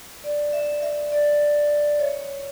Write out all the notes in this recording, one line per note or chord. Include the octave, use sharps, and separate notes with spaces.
D5
E5
E5
D5
C#5